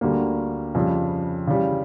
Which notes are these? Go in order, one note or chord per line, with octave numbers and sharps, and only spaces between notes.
D2 D3 G3 A#3
F2 C#3 G3
C#3 E3 G3